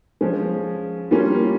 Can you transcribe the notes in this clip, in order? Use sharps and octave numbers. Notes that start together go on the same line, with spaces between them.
F3 G#3 C#4
G3 A#3 C#4 F4